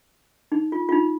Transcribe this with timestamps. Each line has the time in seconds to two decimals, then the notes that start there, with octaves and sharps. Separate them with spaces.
0.52 D#4
0.72 F4
0.89 F4
0.92 D#4